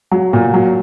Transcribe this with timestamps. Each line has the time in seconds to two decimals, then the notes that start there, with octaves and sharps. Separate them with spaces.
0.11 F#3
0.33 A#2
0.54 F#3